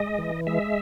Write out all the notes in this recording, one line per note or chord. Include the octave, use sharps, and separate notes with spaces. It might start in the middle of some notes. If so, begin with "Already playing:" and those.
Already playing: G#3 D#5
E3
G#3 E5